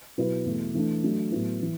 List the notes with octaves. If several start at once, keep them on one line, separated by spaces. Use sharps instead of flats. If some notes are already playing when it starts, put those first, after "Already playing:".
B2 F#3 B3 E4 B4
E2 B2 A3
E3 A3 D4
F#3 A3 D4
A2 F#3 B3 E4
E3